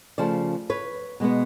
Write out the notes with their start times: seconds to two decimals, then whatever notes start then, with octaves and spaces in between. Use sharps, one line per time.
0.18 C#3 F3 A3 C5 D5
0.70 B4 C#5
1.20 B2 G#3 B3